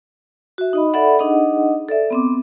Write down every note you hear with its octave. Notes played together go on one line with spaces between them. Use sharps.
F#4 E5
D#4 D#5 B5
A4 D5 E5 F#5 B5
D4 D#4 G#4 D#5 F#5
A4 D5 E5
B3 C4 D6